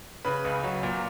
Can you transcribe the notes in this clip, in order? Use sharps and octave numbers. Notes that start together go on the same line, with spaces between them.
C#3 B4
C#2
F#3
A#2